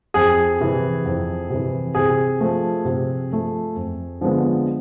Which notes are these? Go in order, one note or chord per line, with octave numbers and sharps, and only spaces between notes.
F2 G#4
C3 E3
F2
C3 E3
C3 G#4
F3 A3
C3
F3 A3
F2
D3 F3 G#3 B3